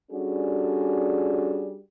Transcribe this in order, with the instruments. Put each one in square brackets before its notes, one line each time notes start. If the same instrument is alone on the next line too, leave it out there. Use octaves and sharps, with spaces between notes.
[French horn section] G3 C#4 D4 F#4 G#4 A4